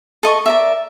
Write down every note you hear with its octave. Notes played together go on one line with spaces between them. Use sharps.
A4 D#5 C#6
A#4 D5 E5